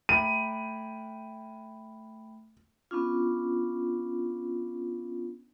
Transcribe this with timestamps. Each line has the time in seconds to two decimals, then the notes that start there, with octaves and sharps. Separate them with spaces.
0.09 A3 G5 B5 D#7
2.91 B3 C#4 D4 F4